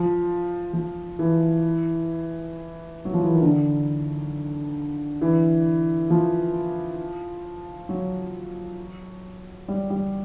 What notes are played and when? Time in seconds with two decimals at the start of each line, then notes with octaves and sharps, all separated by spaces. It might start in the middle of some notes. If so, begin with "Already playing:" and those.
Already playing: F3
0.73 F3
1.19 E3
3.05 F#3
3.13 F3
3.23 E3
3.33 D#3
3.41 D3
5.21 E3
6.10 F3
7.89 F#3
9.68 G3
9.90 G3